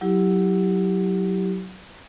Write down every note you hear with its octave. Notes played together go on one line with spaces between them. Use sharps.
F#3 E4 G4